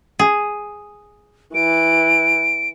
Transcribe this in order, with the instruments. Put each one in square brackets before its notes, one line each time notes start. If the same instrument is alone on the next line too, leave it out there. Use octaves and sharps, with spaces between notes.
[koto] G#4
[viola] E3 [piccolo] D7